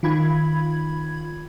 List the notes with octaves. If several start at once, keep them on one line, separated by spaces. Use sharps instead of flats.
D#3 F4 B5 G#6